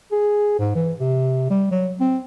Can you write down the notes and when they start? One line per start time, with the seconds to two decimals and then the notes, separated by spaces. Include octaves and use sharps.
0.12 G#4
0.58 G#2
0.75 E3
1.00 C3
1.50 G3
1.71 F#3
2.00 C4